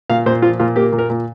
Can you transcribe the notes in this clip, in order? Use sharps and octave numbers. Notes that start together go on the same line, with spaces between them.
A#2 F5
A#2 C5
F3 F4
A#2 F4
A#3 G4
A#2
A#4
A#2